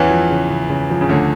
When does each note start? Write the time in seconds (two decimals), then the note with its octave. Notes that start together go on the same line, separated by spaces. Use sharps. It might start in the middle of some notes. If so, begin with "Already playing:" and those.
Already playing: E2 E3 C#4
0.10 F3
0.30 C#3
0.50 C#3
0.70 C#3
0.90 F3
1.01 C#3
1.09 D2 D3 C#4